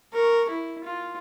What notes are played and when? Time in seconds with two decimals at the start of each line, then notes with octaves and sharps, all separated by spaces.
0.13 A#4 C#6
0.50 E4
0.84 F4